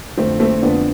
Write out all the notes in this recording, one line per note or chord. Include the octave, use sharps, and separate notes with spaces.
F2 D3 A3 C4
A3 C4
F2 D3 B3 D4